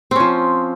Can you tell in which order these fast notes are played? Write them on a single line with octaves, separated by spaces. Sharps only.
C4 C#4 F3